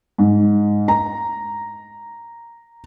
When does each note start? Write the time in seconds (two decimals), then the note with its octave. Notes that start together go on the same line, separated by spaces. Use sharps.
0.18 G#2
0.88 A#5